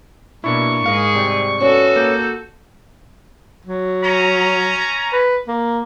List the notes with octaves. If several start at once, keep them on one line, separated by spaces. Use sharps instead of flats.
B2 A#3 D4 E4 C#6
G#2 G#4 A#4 F5 C#7
C3 G3
B3 C#4 F#4 A4 C#5
A#3 G6
F#3
C#4 A#5
B4
A#3